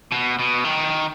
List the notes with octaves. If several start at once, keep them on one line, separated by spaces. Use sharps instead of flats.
B2
B2
D#3